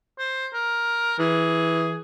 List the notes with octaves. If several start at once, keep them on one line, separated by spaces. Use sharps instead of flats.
C5
A#4
E3 G#4